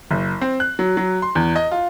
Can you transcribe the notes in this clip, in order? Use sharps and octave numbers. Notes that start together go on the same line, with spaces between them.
F#1
C4
F#6
F#3
F#3
C6
E2
D#5
F4